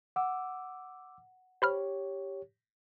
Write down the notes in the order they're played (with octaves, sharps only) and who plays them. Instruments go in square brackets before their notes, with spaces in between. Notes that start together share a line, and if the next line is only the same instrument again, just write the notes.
[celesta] F#5 [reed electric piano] D6 E6
[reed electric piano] G4 C#5 [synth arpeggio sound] C5 B5 F6